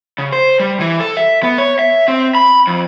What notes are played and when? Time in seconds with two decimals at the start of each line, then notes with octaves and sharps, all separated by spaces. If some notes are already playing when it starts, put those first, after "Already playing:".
0.18 C#3
0.33 C5
0.60 G3
0.80 E3
1.00 A4
1.17 E5
1.43 B3
1.58 C#5
1.79 E5
2.08 C4
2.35 B5
2.67 F2